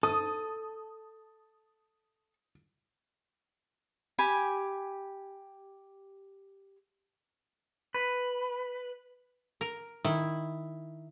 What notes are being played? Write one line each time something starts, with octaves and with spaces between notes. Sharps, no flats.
A4 D#6
G4 G#5 B5
B4
A#4
D#3 E4